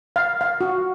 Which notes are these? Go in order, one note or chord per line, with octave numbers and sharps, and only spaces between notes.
F5
F5
F#4